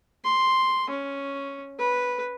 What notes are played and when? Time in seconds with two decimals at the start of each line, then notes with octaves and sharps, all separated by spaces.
0.24 C6
0.90 C#4
1.78 B4